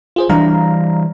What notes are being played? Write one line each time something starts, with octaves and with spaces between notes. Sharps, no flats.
F4 G#4 C5
E3 G3 D4 F5 A#5